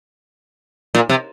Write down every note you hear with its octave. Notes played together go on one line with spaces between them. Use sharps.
A#2
C3